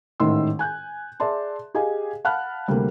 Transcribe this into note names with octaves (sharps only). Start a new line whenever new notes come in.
A1 G#2 D#3 E4 C6 E6
G#5 F#6 G6
G#4 D5 E5 A5 C6
G4 G#4 D#5 F5 G#5
F5 F#5 A5 B5 F6 F#6
D2 C3 G3 A#3